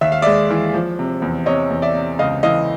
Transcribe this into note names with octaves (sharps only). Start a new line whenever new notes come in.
D#2 E5
F5
G#3 D5 E5
E3
F3
C3
E2
C3 C#5 D#5
E2
D5 E5
C3
C#2 D#5 F5
E3 D#5 F5